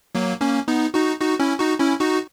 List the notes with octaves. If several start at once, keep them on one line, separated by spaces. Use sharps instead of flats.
F#3 A#3
A#3 C#4
B3 D#4
D#4 F#4
D#4 F#4
C#4 E4
D#4 F#4
C#4 E4
D#4 F#4